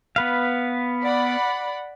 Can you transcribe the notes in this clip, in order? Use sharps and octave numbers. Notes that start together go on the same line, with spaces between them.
B3 B4 F5
D5 F#5 B5